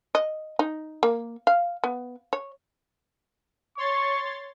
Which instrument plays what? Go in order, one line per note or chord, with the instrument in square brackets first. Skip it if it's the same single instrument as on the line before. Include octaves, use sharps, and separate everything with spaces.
[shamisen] D#5
D#4
A#3
F5
B3
C#5
[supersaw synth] C#5 C6 A6 [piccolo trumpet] C#6